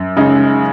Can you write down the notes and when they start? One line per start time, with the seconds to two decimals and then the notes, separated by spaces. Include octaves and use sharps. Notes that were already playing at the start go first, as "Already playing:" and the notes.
Already playing: F#2
0.16 C#3 G#3 D#4